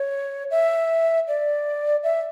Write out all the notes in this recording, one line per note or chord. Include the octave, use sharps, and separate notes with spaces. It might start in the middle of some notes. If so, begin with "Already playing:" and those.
Already playing: C#5
E5
D5
E5